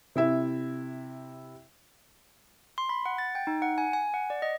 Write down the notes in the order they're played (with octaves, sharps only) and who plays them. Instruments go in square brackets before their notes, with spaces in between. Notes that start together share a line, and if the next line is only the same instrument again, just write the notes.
[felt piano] C3 E4 E5
[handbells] C6
B5
F#5
A6
G5
D#4
F#5
G#5
G#5
F#5
D5
D#5